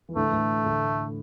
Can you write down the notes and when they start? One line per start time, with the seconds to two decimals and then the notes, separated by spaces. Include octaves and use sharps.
0.09 E3
0.16 A2 D3 A3
0.27 E3
0.32 A2 D3
0.65 A2 D3